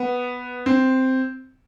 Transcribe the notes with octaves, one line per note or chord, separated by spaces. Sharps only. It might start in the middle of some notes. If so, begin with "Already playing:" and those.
Already playing: B3
C4